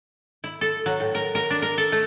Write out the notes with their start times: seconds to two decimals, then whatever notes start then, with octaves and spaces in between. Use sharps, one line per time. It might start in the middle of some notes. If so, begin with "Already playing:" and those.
0.44 E4
0.61 A4
0.86 F#3
1.00 A2
1.15 A#4
1.35 A#4
1.50 D4
1.62 A#4
1.78 A4
1.92 A3